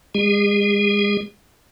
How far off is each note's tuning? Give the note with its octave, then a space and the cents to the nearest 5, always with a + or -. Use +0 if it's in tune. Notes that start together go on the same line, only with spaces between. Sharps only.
G#3 -30 G#4 -35